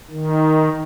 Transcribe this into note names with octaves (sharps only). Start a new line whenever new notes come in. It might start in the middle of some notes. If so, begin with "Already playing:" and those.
D#3